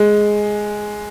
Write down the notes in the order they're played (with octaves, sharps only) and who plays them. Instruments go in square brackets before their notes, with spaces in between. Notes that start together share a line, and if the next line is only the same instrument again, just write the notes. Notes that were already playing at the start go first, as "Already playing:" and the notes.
Already playing: [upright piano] G#3